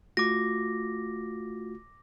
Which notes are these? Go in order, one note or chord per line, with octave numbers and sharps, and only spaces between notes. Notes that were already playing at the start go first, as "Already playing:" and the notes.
A3 F4 F#4 D6 A#6